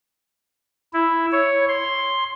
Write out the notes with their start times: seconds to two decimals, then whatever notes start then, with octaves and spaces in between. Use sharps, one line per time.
0.94 E4
1.32 C#5
1.69 C6